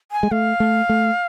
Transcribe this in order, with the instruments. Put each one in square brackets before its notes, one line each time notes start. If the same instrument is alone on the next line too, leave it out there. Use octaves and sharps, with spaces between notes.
[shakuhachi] G#5
[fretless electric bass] G#3
[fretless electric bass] A3 [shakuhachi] F5
[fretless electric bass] A3
A3